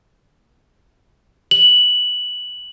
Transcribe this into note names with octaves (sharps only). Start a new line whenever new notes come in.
F#7